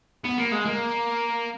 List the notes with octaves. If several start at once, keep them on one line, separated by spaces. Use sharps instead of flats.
B3
A#3
G#3
A#3